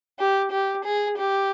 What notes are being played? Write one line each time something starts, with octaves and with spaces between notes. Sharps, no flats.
G4
G4
G#4
G4